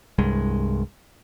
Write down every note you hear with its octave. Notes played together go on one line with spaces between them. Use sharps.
C2 G2 G#3